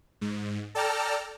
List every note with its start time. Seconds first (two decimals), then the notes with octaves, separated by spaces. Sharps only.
0.21 G#2
0.75 A4 D5 G5 A5 A#5 F6